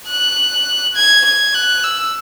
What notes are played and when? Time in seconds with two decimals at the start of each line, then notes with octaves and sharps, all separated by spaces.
0.08 F#6
0.95 G#6
1.25 G#6
1.54 F#6
1.84 E6